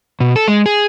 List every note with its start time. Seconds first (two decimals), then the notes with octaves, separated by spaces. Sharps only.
0.20 B2
0.36 A4
0.48 G#3
0.66 G#4